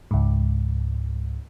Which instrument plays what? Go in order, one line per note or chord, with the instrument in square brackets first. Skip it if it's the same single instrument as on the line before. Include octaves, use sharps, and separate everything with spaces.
[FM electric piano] C#2 G#2